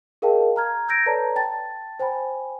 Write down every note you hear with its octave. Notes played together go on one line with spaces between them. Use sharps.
G#4 A#4 D#5 F5 G5 A5
A#5 F6 G#6
E6 G6 G#6 A#6 D7
A4 B4 C#5 D5 A5 A#5
G5 A5 A6
C5 G5 G#5 B5